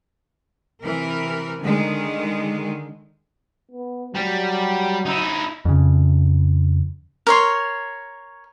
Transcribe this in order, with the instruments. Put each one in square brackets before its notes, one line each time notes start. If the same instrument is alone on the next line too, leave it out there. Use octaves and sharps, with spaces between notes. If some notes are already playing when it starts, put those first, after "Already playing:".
[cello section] C3 E3 A#4
D3 D#3 G#3
[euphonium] B3
[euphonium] F#3 [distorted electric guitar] G3
[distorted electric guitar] D#4 E4
[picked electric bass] F2 C#3
[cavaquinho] A#4 C#5 C6